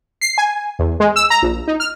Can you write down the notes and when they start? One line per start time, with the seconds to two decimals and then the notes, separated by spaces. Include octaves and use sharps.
0.21 C7
0.38 G#5
0.79 E2
1.00 G#3
1.16 E6
1.30 A#5
1.42 A#1
1.67 D#4
1.80 F6